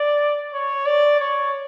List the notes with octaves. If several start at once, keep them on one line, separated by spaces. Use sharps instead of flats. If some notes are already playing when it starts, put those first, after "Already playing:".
Already playing: D5
C#5
D5
C#5